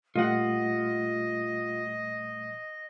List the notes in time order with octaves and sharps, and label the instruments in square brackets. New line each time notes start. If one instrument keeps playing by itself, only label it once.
[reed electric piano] A#2 G3 A3 [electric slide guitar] F4 F#5 [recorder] D#5